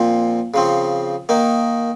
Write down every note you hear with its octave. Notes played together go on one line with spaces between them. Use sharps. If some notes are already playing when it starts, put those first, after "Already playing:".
Already playing: A#2 F3 C4
C#3 F3 C4
D#3 A#3 D#4